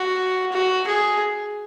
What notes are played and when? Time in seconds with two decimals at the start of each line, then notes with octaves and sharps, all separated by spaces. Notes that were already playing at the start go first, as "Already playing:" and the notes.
Already playing: F#4
0.52 F#4
0.88 G#4